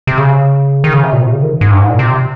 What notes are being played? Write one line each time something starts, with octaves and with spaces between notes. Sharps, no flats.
C3
C#3
D#3
C#3
C3
A#2
C3
C#3
D#3
G#2
G2
G#2
A#2
C3